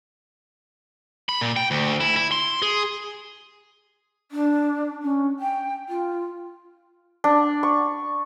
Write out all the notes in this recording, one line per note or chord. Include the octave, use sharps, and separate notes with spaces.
B5
A#2
G5
D2
E4
E4
C6
G#4
D4
C#4
G5
F4
D4
C#6